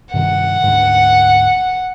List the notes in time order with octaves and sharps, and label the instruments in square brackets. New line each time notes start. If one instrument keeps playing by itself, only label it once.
[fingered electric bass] G2 C3 D#3 [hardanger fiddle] F#5
[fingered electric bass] D2 G#2